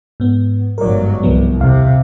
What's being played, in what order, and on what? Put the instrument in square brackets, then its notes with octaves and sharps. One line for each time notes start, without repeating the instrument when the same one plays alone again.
[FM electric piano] G#2 B3
[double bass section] G1 G#2 F#3 [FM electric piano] A#4 D5
[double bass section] C2 [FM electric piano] F3 F#3 B3
[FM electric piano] D#2 F5 [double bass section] C3